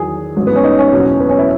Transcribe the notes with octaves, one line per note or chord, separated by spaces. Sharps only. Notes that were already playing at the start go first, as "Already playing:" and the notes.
Already playing: E2 D#3 F#3 G#4
A1 G#2 F#3
B3
C#4
D#4
C#4
F#1 E2 B2 F#3
B3
C#4
E4